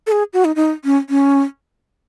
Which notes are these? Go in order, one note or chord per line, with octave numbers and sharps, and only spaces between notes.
A4
G#4
F#4
D#4
D#4
C#4
C#4